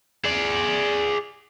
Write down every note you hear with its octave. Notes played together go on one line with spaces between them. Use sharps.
G#4 D5